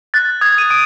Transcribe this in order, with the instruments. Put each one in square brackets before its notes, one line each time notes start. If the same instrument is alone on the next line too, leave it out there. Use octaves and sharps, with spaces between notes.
[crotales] F#6 A6
D#6 G#6
D#7
D#6 D7